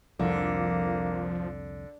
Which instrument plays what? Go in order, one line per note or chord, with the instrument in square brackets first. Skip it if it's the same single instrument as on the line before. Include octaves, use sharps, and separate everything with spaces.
[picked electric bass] C2 F2 [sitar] D3 [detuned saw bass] F3 [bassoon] A#3